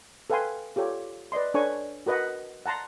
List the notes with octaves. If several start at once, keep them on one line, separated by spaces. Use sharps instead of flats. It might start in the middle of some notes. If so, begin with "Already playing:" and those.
A4 B4 F5 G5 G#5 C6
F4 G4 A4 C#5
B4 D5 D#5 C6
D4 A4 B4 C#5 G#5 C#6
F#4 A#4 B4 D#5 F#5
F#5 A5 A#5 C6